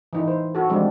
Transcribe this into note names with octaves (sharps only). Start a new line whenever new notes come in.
E3 D#4 E4
C5
F#4 A4
E3 F3 G3 G#3 C4 D4